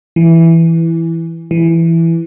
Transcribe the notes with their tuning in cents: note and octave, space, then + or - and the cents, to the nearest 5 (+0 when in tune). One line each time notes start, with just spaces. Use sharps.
E3 +5
E3 +10